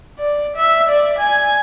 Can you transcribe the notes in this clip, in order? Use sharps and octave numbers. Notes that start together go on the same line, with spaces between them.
D5
E5
D5
G#5